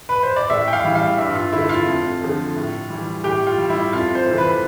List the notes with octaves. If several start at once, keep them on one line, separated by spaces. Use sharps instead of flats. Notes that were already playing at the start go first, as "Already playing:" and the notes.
B4
C5
D5
A2 E5
G5
F5
E3 G3
F5
G2 E5
F4
D3 A3 E4
F4
F2
D3 F3 A3
A2
E3 G3
A2 G4
F4
G3
E4
F2 F4
C5
C3 E3 A3
B4